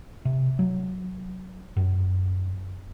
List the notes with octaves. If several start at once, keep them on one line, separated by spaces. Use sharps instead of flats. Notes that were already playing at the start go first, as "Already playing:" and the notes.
C3
F#3
F#2